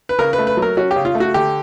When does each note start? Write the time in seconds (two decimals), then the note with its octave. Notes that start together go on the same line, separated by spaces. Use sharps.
0.09 B4
0.19 C#3 A#4
0.33 B4
0.38 A3
0.47 B4
0.57 F#3
0.62 A#4
0.77 C#4 F#4
0.91 G4
0.96 C#3
1.05 F4
1.15 A3
1.20 F#4
1.34 D3 G4